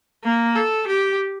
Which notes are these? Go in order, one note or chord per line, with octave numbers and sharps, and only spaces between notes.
A#3
A4
G4